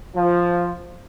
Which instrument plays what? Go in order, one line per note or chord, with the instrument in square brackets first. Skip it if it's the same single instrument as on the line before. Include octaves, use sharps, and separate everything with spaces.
[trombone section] F3